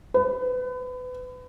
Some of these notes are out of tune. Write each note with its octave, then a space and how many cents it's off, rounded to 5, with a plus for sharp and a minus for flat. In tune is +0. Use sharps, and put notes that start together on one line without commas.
B4 +30